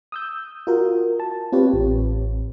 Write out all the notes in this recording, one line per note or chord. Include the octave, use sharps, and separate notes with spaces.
D#6 E6 G6
F4 F#4 A#4
A5
C4 F4 G4 B4 C#5
A1